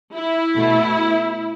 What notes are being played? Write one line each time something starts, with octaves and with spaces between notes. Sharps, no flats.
E4
B2 A3